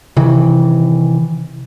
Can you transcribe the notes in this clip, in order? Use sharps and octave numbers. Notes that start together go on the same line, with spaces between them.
C3 D#3 E3